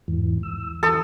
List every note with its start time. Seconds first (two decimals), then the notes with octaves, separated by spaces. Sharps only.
0.08 E2 G#2 E3
0.43 E6
0.83 E3 A4 D#6